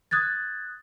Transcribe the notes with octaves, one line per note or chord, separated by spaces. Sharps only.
D#6 F#6 G#6 A6